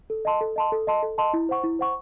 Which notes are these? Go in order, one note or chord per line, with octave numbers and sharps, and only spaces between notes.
A4
D#5 A5 C6
A4
D#5 A5 C6
A4
D#5 A5 C6
A4
D#5 A5 C6
E4
C5 F#5 C#6
E4
C5 F#5 C#6